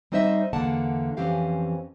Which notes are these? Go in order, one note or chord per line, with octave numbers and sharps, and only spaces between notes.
G3 C4 D#4 C5 D#5 E5
E2 D3 A#3 F#5 A5
F2 E3 C4 C#4 G4 F5